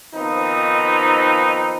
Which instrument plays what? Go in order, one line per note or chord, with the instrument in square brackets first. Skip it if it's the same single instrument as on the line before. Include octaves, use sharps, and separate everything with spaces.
[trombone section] F2 D#3 F3 B3 C4 D#4